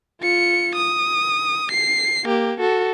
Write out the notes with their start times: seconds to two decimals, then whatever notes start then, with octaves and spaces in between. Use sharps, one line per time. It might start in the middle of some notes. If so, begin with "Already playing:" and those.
0.22 F4 C#7
0.76 D#6
1.71 C7
2.25 A#3 G4
2.60 F#4 A4